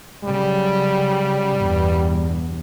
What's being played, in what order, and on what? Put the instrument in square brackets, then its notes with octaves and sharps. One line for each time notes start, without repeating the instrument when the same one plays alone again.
[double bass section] C#3 F#3 [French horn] G3
[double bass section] E2 G2 B2